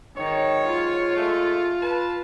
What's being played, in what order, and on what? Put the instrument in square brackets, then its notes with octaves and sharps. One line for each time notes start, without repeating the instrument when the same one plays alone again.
[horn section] G#2 F#3 C#5 [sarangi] D#3
[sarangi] F4
[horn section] G#3 A3
B4 A5